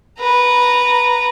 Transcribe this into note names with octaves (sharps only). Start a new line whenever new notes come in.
B4 A#5